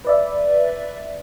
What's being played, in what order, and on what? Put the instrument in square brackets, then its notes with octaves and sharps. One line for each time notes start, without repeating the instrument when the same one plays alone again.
[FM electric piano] B4 D5 E5